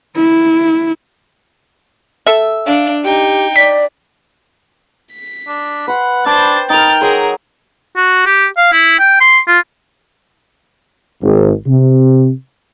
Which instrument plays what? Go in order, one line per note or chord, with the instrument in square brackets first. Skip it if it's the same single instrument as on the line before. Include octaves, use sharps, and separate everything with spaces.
[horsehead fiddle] E4
[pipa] A4 E5
[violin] D4 [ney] F5
[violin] D#4 G5 [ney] G4
[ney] D5 [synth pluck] B6
[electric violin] B6
[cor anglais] D4
[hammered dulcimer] B4 C6 [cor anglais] F#5
[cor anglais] D4 [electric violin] C5 A6 [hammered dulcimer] G5 A5 B5
[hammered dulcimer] D#4 A#4 [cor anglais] G5 [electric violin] F6 A6
[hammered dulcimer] F#3 C6 [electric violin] G#4 A#4
[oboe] F#4
G4
F5
E4
G5
C6
F4
[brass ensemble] G#1
C3